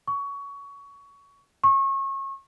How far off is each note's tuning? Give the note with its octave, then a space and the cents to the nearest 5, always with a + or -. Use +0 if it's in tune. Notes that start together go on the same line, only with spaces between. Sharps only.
C#6 +20
C#6 -30